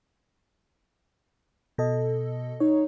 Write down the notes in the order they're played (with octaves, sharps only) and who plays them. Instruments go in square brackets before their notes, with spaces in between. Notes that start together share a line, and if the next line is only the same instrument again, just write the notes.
[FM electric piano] B2 A4 D#5
[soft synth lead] D#4 [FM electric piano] C#5